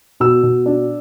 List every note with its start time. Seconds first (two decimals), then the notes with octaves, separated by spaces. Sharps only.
0.20 B2 E6
0.43 B2
0.66 D4